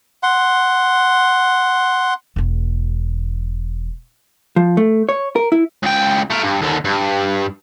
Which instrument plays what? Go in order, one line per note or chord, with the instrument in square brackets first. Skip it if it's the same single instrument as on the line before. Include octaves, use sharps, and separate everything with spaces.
[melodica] F#5 C6
[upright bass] E1 E2
[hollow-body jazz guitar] F3
A3
C#5
A#4
E4
[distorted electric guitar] C#2 G5
A3 A#4
G2
D#2 D3
G2